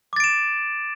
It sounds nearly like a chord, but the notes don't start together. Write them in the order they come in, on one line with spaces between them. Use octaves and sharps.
D6 A6 D7 E7